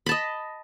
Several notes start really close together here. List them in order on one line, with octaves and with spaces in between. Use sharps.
B5 A5 D#5